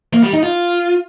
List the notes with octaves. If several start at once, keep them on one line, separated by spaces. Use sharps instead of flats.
A#3
G3
D#4
F4